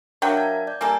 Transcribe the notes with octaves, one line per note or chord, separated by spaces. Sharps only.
F#3 D4 A#4 E5 F5 G5
A5 G#6
D5 G6
G3 A#3 A4 G#5